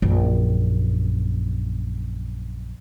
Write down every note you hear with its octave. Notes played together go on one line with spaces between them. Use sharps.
A#1 F#2